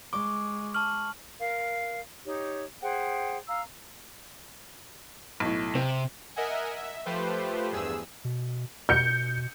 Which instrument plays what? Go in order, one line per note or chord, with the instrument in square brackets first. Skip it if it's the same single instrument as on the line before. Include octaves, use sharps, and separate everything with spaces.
[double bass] G#3 [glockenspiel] C#6 [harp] D6
[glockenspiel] A5 C#6 F#7 [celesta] F6
[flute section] A#4 F5
D#4 G4 C#5
G#4 C5 F#5 G5
F5 A#5 E6
[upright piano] B1 A2
[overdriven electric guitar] C3 [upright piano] C4
[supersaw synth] A#4 D#5 E5 F#5 G#5
E5
F3 A3 G4 B4 C5
E2 G2 G#4 E6
[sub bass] B2
[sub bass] B2 [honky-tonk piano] G6 C#7